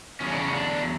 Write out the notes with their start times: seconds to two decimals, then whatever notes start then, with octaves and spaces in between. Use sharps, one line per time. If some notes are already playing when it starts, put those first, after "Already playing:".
0.20 E2 C#3 F#3 C#4
0.30 D4
0.40 C#3 C#4
0.53 D3 D4